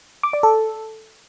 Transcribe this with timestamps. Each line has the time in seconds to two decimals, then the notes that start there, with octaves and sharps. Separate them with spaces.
0.23 D6
0.33 D5
0.43 A4